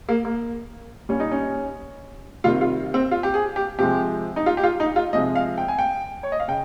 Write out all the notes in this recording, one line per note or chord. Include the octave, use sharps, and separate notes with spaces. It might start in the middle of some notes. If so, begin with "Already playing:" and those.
A#3
A#3
A#2 G3 C#4
D#4
C#4
C3 D#3 G3 F4
F4
C4
F4
G4
G#4
G4
C3 F3 G#3 G4
D#4
F4
G4
F4
D#4
F4
C3 F3 G#3 D#5
F5
G5
G#5
G5
C#5
D#5
F5
C#3 G5